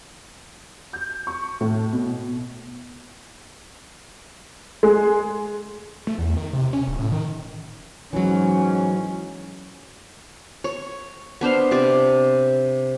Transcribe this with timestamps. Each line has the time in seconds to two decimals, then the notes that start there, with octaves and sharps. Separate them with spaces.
0.93 G6
1.27 C#6
1.61 A2
1.93 B2
4.83 G#3
6.07 A3
6.18 E2
6.37 D#3
6.53 C3
6.73 C#4
6.88 D1
6.99 A2
7.12 D#3
8.13 G#2 E3 F#3 C#4
10.64 C#5
11.41 B3 D4 C5 F5
11.71 C3 D5